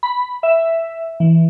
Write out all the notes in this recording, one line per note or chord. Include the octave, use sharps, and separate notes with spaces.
B5
E5
E3